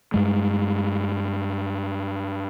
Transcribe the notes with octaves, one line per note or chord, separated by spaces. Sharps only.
G2 G#3